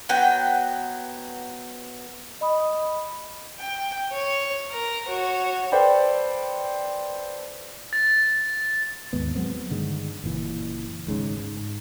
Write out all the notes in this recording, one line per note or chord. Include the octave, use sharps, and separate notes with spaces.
F#3 B3 G5
D#5 B5 D#6
G5
C#5
A#4
F#4 C#5
A4 B4 C5 D5 G5 B5
A6
D#2 G#2 B3
F#3 G#3 B3 C4
G2 D3 D#3 G#3
F#1 A#2 E3
G#1 G#2 C#3
G#2